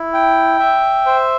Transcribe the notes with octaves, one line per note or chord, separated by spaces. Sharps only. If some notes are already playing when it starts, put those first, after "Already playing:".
Already playing: E4
G5
E5
C5